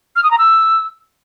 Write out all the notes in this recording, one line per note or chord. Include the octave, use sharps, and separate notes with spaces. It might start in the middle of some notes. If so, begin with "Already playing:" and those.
F6
D#6
A#5
E6